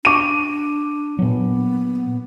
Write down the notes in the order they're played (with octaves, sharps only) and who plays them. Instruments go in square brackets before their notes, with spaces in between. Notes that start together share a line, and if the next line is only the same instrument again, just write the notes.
[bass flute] D4 [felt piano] D6 D#7
[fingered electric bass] A#2 F#3 [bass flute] B3